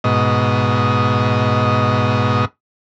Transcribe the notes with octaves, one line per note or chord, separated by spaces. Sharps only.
G#2 B2 D#5